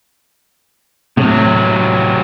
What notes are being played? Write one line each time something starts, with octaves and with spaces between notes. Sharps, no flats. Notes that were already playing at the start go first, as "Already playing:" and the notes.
A2 C3 F#3